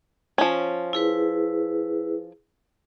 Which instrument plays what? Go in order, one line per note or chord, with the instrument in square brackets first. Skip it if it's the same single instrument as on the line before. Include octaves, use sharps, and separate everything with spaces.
[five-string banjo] F3 C#4
[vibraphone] E4 G#4 B4